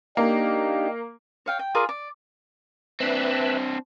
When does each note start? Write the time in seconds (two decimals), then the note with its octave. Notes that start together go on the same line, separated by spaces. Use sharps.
0.17 A#3 D4 D#4 G4
1.46 C#5 F5 G5
1.59 G5
1.75 F4 G#4 A#4 D5
1.89 D5
3.00 C4 D4 B4 E5